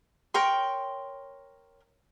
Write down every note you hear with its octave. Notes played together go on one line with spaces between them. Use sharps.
A#4 C#5 G5 C6